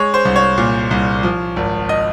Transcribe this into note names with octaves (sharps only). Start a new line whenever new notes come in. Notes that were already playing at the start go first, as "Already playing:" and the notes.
Already playing: G#3 C#5
C5
C2
C#5
A#2
C2
F3
G#1
D#5